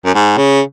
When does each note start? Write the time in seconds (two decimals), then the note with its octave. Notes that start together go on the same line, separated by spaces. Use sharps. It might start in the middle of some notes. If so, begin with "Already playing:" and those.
0.05 F#2
0.15 G#2
0.37 C#3